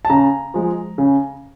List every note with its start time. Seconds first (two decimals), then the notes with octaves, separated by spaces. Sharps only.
0.05 A5
0.10 C#3 A#5
0.54 F3 G#3
0.98 C#3